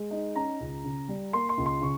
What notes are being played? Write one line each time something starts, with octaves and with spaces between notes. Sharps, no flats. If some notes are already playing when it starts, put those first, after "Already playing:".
Already playing: G#3
D#4
C#4 A#5
C#2
C#3
G3
A#3 C6
C6
C#2
C6
C#3 C#6